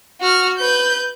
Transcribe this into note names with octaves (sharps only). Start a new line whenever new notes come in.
F#4 F6
B4 G6